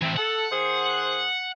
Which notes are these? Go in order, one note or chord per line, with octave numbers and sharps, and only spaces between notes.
E3 A3 C4
A4 F#5
D#3 G#4 C5